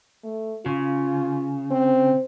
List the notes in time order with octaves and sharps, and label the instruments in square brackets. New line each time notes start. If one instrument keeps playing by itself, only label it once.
[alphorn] A3
[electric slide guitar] C#3 [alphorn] F4
[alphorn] C4